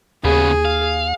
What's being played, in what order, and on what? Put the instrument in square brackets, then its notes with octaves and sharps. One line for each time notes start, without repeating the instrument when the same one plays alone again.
[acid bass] D#2 [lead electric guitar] C#3 B3 [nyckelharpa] G#4
[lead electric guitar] F5